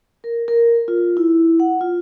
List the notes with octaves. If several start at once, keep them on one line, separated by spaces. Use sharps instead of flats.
A#4
A#4
F4
E4
F#5
F4